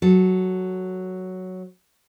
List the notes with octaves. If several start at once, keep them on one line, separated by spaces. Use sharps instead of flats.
F#3 A4